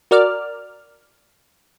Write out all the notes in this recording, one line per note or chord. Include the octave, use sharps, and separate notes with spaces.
F#4 A#4 D5 F6